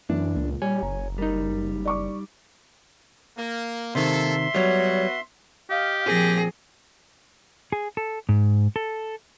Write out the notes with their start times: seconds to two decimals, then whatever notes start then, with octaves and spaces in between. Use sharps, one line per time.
0.10 F#2 E3 D4
0.36 C#2 A#2
0.62 G3 C#5 G#5
0.83 F#1 A#5
1.18 G3 D#4 A#4 D#5
1.85 D5 C#6 D6
3.37 A#3
3.95 C3 D#3 A#3 A4 E5 C6
4.55 F#3 G3 B3 F#4 C#5
5.70 G4 D#5 F5
6.06 A#2 F3 C4 G#4 A#6
7.72 G#4
7.97 A4
8.29 G#2
8.76 A4